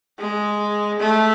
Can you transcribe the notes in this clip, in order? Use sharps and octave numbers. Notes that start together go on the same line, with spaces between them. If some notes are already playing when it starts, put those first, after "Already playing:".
G#3
A3